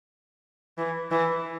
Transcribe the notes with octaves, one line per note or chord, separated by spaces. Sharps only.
E3
E3